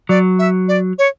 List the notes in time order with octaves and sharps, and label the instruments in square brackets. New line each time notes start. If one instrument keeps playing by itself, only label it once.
[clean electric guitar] F#3 [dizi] D5
[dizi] E5
D5
C#5